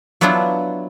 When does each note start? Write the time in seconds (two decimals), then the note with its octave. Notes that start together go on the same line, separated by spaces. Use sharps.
0.21 F#3 B3 D4 E4 F4